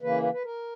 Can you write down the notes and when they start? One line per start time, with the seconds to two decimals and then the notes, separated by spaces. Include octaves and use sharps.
0.01 C#3 E3 A#3 B4
0.23 B4
0.33 B4
0.44 A#4